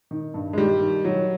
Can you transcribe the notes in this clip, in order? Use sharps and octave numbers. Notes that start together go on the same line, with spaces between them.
D#3
G2
G#3
D#3 G3
D#3
D#3 F#3